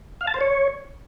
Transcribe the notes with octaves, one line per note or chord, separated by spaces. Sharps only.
F5
A5
C5
C#5